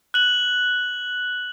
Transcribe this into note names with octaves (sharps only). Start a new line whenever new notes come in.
F#6 F#7